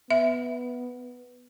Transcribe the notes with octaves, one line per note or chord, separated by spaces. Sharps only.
B3 E5